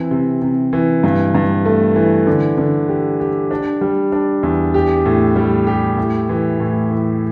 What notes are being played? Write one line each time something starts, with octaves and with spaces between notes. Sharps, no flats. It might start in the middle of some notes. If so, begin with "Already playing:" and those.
Already playing: E3 C4
C3
C3
E3
G2
G2
A3
E3
D3
D3
G4
G4
D4
G3
D4
E2
G4
A2
G3
G4
A2
E3
A2
E3